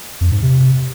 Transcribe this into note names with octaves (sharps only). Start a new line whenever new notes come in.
F2
G#2
C3